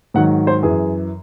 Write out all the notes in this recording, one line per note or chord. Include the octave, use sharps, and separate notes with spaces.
G#2 D#3 F#3 F#5
C5
F#2 E3 G#4